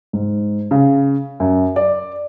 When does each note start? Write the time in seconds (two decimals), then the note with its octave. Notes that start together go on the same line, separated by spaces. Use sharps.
0.13 G#2
0.71 C#3
1.40 F#2
1.76 D5